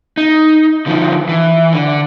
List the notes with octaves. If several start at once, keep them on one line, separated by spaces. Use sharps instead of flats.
D#4
D3 D#3 F3
E3
D3